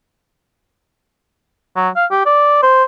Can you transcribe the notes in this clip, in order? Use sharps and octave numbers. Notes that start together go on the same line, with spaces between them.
F#3
F5
G4
D5
C5